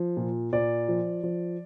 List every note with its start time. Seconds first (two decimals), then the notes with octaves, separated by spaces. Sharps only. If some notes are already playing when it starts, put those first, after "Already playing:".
Already playing: F3
0.17 A#2
0.53 A#2 D5
0.88 F3
1.23 F3